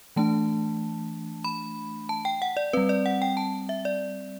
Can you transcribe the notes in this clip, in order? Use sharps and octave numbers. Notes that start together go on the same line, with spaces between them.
E3 A3 D4 A5
B5
A5
G5
F#5
D5
G3 C4 B4
D5
F#5
G5
A5
E5
D5